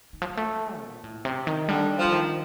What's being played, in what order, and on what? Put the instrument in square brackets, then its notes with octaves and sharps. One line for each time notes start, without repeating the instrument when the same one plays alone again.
[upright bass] D#3
F3
G3
A3
A#2
A2
C3
D#3
[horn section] D3 [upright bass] G3
[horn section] F3
[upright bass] D3
D#3